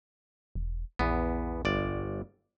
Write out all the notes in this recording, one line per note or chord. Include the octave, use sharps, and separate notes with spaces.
E1
A#1 E2 B3
G1 D5